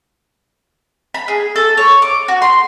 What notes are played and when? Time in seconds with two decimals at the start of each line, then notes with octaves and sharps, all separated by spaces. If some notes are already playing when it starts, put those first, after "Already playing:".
1.14 B5
1.28 G#4
1.56 A4
1.77 C#5
2.02 D6
2.28 F#4
2.42 C6